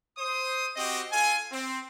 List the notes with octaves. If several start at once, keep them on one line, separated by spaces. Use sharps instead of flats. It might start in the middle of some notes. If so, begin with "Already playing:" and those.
C5 D#6
C4 F#4 G4 D#5
F4 A4 G#5
C4